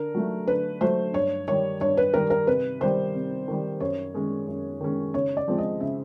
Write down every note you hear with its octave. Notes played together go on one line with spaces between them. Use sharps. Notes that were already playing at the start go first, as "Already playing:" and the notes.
Already playing: D3 A#4
F#3 A3
D3 B4
F#3 A3 C5
G2 C#5
D#3 G3 C#5
G2 C#5
B4
D#3 G3 A#4
A#4
C3 B4
D#3 G3 C5
C3
D#3 G3
F#2 C#5
D#3 G#3 C#4
F#2
D#3 G#3 C#4
C#3 C#5
D5
F3 G#3 C4
D#5
C#3 E5